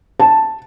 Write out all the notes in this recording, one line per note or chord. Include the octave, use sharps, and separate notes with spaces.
A5